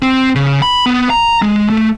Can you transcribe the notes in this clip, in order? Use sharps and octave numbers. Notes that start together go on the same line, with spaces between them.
C4
C#3
B5
B3
A#5
G#3
A3